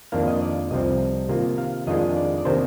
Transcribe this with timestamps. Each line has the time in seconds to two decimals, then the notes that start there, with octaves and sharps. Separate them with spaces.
0.12 F2 D#3 A#3 D4 F5
0.27 D#5
0.42 D5
0.71 C2 C3 F3 C4 D#5
1.29 C3 D#3 A#3 F4
1.58 F5
1.87 F2 D#3 G#3 D4 F4 D#5
2.17 D5
2.38 D5
2.45 C3 D#3 A#3 D4 C5